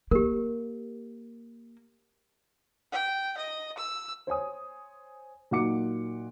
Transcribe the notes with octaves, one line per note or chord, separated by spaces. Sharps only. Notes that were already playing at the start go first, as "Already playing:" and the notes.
A#3 G4 A#4
G5
D#5
E6
C5 C#5 G#5 D#6
A#2 F#3 D#4 F#5 D6 C#7